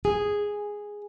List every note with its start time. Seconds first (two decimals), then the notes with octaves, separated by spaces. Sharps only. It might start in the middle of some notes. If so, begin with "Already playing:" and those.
0.05 G#4